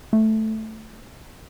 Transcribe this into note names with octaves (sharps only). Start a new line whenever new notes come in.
A3